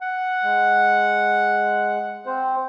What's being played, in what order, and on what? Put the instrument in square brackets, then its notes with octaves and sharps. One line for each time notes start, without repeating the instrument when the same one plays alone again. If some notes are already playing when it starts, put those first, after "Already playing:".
[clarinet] F#5
[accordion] G#3
C4 C5